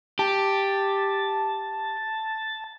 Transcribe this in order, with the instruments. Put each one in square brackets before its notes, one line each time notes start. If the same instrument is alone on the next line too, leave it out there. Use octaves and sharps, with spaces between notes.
[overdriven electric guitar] G4 [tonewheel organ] A5